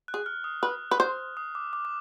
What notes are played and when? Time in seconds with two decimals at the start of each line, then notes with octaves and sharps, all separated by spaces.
0.08 F#6
0.14 G#4
0.26 F6
0.44 D#6
0.63 B4
0.91 B4
1.00 C5
1.37 D#6
1.55 D6
1.73 D6
1.85 D6